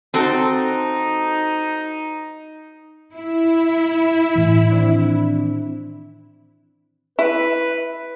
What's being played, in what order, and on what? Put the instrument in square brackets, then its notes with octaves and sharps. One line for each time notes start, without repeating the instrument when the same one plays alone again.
[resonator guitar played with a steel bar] C4 F#4 A4 [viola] D#4
[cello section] E4
[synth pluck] A2 E3
D#3 C4 D4
[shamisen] E4 [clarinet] B4